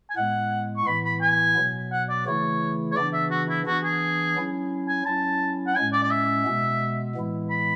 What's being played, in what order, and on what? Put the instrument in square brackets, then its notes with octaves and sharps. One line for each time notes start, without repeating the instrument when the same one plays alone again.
[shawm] G#5
[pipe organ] A2 G#3 B3 [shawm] F#5
[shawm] C#6
[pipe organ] A2 E3 B3 E4 [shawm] B5
[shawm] B5
G#5
[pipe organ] B2 F#3 B3
[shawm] F#5
D5
[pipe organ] C#3 E3 A3 E4 [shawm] C#5
[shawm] C#5
[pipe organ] C#3 E3 B3 D4 [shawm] D5
[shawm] E5
F#4
E4
[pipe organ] E3 B3 D4 [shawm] F#4
[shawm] G#4
[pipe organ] F#3 C#4 E4
[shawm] G#5
[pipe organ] F#3 C#4 E4 [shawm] A5
[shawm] F#5
[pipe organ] A2 G#3 C#4 [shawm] G#5
[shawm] D5
D5
E5
[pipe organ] B2 G#3 B3
A2 E3 G#3 B3 E4
[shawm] B5